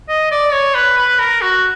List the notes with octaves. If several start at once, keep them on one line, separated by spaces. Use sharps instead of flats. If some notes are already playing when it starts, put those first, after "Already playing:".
D#5
D5
C#5
B4
B4
A#4
F#4